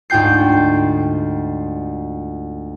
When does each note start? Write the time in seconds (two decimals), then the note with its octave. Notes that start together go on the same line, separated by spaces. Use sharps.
0.10 D2 G#2 F4 G5 G6 C7